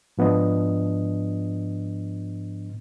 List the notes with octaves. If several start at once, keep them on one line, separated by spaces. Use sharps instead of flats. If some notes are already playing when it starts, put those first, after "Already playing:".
G#2 F3 B3 D4 D#5